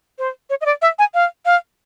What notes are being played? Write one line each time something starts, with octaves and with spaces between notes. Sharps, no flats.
C5
C#5
D#5
D5
E5
G#5
F5
F5